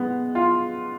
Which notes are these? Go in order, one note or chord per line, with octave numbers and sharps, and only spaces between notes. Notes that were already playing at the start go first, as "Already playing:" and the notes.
Already playing: G#3 B3
F4